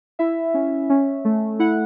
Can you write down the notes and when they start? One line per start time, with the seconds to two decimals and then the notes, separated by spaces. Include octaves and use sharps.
0.19 E4 E5
0.54 C#4
0.90 C#4
1.25 A3
1.59 E4 F#5